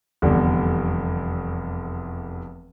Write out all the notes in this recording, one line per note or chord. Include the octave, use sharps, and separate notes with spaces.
F1 E2 D3 G3